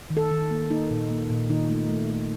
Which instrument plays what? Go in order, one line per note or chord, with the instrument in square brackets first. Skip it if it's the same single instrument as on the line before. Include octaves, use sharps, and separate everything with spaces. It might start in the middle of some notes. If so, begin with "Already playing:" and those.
[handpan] D#3
A4
D#3
A#3
A#3 D#4
A#2
A#3
A#2
D#3 D#4
A3
A3
A3